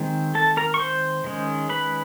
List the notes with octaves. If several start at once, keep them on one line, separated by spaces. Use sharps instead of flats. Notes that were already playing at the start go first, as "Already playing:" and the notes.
Already playing: D#3 G#3 C4
A4 A5
A#4 A#5
C#6
C5 C6
D#3 G#3 C#4
B4 B5